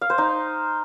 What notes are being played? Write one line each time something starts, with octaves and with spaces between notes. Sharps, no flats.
F5
C5
D#4